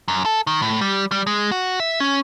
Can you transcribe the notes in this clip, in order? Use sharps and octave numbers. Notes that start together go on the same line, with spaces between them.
F#2
A4
D#3
A2
G3
G3
G#3
F#4
E5
C#4